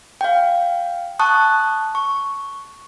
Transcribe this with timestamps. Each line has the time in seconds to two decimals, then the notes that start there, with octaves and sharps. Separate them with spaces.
0.21 F5 G5
1.19 A5 C#6 D#6 F#6
1.95 C#6